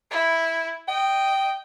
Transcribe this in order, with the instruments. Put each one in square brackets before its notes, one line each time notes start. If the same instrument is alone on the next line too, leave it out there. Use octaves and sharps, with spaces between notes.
[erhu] E4
[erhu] D#5 [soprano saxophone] G5